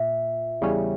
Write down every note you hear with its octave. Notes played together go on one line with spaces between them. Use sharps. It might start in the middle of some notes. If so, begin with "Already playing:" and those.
Already playing: A#2 E5
E2 C#3 G3 C#4